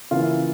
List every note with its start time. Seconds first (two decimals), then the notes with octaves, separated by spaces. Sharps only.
0.11 C#3 E3 A#3 F4
0.21 E4